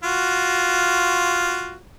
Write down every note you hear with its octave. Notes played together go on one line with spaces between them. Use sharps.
F4 F#4